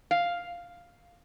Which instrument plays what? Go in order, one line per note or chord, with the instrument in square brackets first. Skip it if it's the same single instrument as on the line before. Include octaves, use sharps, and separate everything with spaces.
[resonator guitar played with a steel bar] F5